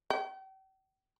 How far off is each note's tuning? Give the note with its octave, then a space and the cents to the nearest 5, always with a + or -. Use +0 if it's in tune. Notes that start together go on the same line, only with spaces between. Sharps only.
G5 -40